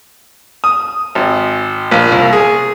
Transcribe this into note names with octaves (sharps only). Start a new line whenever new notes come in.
D#6
G#1
A#1
C2
G#4